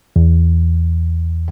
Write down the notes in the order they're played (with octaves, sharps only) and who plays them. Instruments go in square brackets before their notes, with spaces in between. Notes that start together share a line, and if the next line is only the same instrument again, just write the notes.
[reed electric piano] E2